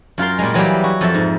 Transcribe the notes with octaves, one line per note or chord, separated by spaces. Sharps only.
F#2 F4 A#4 C6
A#2 G3 G#3
E3 F#3 G3 G4
F#4
F2 A4 E5
G#2